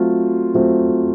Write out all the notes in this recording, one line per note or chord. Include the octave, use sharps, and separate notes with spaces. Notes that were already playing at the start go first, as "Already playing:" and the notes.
Already playing: F#3 A3 C4 F4
F#3 A3 C4 F4